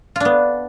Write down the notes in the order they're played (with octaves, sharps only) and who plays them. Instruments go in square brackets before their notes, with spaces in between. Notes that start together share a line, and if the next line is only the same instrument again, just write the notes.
[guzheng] F4
D4
B3